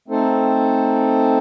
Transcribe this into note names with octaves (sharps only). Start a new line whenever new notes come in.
A3 C4 D#4 A4 C5